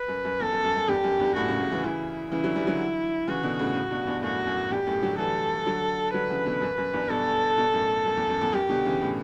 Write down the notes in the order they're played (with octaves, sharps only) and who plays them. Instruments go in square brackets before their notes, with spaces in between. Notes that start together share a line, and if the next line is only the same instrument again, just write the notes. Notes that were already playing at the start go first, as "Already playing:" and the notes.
Already playing: [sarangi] B4
[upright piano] F#2
F#2
[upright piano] E2 [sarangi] A4
[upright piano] F#2
F#2
F#2
[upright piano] E2 G2 [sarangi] G4
[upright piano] F#2
E2 G2
[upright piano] F#2 A2 [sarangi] F#4
[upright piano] A2 C#3
A2 C#3
C#3 E3
[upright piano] C#3 E3 [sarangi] E4
[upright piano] C#3 E3 [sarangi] E4
[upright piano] D3 F#3
E3 G3
D3 F#3
[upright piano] C#3 E3 [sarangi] F#4
[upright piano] B2 D3
A2 C#3
A2 C#3
G2 B2
E2 G2
[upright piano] F#2 A2 [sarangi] F#4
[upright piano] F#2 A2
[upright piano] E2 G2 [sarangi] G4
[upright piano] F#2 A2
D3 F#3
[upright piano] E3 G3 [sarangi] A4
[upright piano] D3 F#3
[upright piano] D3 F#3 [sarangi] B4
[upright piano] C#3 E3
B2 D3
F#2
F#2
E2 G2
[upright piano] G2 B2 [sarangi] A4
[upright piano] G2 B2
F#2 A2
F#2
E2
F#2
E2
[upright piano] F#2 [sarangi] G4
[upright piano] B2 D3
C#3 E3
A2 C#3